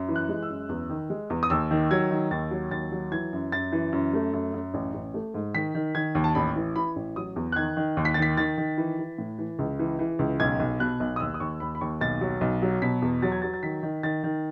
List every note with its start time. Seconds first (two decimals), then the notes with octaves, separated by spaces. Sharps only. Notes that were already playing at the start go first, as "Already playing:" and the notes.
Already playing: F#2
0.09 E3
0.16 F#6
0.29 G#3
0.43 E6
0.50 F#2
0.69 E2
0.90 D#3
1.10 G#3
1.30 E2
1.43 D#6
1.50 D#2 E6
1.71 D#3
1.91 F#3 G#6
2.11 D#3
2.31 D#2 A6
2.51 F#3
2.71 D#2 A6
2.92 F#3
3.12 E3 G#6
3.33 F#2
3.52 F#2 A6
3.72 E3
3.93 F#2
4.14 A3
4.33 F#2
4.54 F#2
4.74 A1
4.94 A1
5.14 A3
5.34 G#2
5.54 D#3 B6
5.75 D#3
5.95 D#3 G#6
6.15 D#2
6.24 A5
6.35 A1 B5
6.56 E3
6.76 E3 B5
6.96 A1
7.16 F#3 D#6
7.36 E2
7.52 F#6
7.56 D#3 G#6
7.77 D#3
7.97 D#2
8.05 B6
8.14 D#3 A6
8.22 B6
8.37 D#3 A6
8.58 D#3
8.78 E3
8.98 E3
9.18 A2
9.38 E3
9.59 C#2
9.79 E3
9.99 E3
10.19 C#2
10.40 B1 G#6
10.60 B1
10.80 B2 F#6
11.00 B1
11.16 D#6
11.20 D#2 E6
11.34 D#6
11.40 D#2 C#6
11.60 D#2 B5
11.75 B5
11.81 D#2 C#6
12.01 B1 A6
12.21 F#3
12.41 B1
12.62 F#3
12.82 B2 B6
13.02 E2
13.22 F#3 A6
13.32 G#6
13.42 F#3 A6
13.54 A6
13.63 D#3 B6
13.83 D#3
14.03 D#3 A6
14.24 D#3